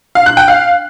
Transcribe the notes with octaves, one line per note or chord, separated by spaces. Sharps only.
F5
F#6
G5
F5